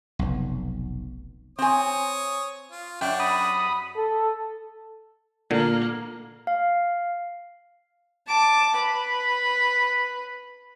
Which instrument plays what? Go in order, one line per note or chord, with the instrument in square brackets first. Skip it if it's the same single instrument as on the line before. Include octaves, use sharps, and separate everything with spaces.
[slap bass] F1 B1
[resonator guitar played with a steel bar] C4 G#5 [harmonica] C#5 D#6
[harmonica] F4
[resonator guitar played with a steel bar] F#2 [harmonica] D4 C#5 [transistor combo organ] G5
[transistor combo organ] B5 D#6
[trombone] A4
[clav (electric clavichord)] A#2 D3 [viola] A#3
[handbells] F5
[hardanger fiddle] A5 D6
B4